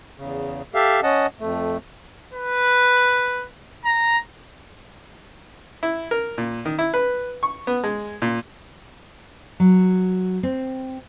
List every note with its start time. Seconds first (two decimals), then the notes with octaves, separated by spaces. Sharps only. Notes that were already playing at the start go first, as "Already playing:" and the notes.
0.18 E2 C#3
0.74 G4 A4 E5 F5
1.03 C#4 D#5 F#5 A5
1.40 F2 A3
2.33 B4
3.85 A#5
5.83 E4
6.11 A#4
6.38 A#2
6.66 D#3
6.79 E4
6.94 B4
7.43 C#6
7.67 B3
7.84 G#3
8.22 A#2
9.60 F#3
10.43 C4